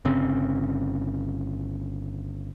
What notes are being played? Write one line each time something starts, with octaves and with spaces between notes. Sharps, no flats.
G1 C#3 C4